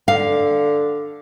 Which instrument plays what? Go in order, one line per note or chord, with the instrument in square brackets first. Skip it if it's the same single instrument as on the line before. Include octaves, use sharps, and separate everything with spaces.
[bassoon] D3 [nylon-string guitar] F5